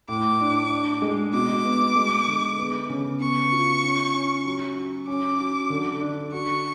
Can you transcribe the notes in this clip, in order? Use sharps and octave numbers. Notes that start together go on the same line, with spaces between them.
A2 D6
D4
D4
G#3
B2 D6
B3
G#3
D3
B3
C#3
B3 C#6
F4
C#4
C#4
F#3
F#4
C#4 D6
F#3
D3
D4
F#4 C#6